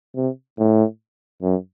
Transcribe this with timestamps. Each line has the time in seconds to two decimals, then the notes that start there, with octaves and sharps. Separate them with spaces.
0.16 C3
0.58 A2
1.42 F#2